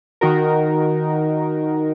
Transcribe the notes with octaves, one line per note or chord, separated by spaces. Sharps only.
D#3 D#4 F#4 A#4